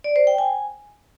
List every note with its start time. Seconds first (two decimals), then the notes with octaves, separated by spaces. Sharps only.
0.04 D5
0.16 C5
0.27 G5
0.38 G#5